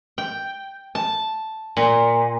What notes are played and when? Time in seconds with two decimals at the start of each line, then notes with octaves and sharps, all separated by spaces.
0.18 G5
0.95 A5
1.77 A#2